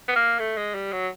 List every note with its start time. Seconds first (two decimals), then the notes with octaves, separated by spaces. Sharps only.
0.08 B3
0.16 A#3
0.39 A3
0.57 G#3
0.75 G3
0.92 F#3